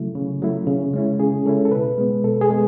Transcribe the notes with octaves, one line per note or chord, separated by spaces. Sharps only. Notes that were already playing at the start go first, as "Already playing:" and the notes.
Already playing: C#3 F#3 A3 E4
C#3
F#3 A3 E4
C#3
G#3 C#4 E4
C#3 G#4
G#3 C#4 E4 A4
A4
B2 B4
G#3 B3
B2 A4
G#4
G#3 B3